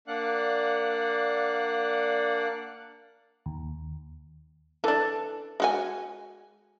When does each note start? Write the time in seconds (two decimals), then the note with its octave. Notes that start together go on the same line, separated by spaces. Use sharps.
0.08 A#3 D4 D5 F5 F#5 F#6
3.46 D#2
4.84 E3 D4 A4
5.60 G#3 F#4 G#5